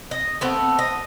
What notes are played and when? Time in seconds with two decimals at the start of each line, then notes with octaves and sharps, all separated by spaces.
0.11 D#5
0.41 A3 B3 C4
0.79 D#5